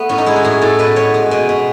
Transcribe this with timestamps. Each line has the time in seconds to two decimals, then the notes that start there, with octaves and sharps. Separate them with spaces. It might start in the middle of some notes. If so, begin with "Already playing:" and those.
Already playing: A3 B3
0.09 A2 C#4
0.18 D#4
0.26 G#3 E4
0.36 F#4
0.44 A2 G#4
0.62 A2 A4
0.79 B2 B4
0.96 B2 C#5
1.14 G#3
1.31 B2
1.49 B2